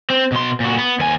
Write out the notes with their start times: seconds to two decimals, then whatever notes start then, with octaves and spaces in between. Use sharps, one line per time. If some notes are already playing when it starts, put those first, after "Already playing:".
0.10 C4
0.32 B2 C6
0.60 A#2 F#4
0.78 B3
0.99 D#2 G#5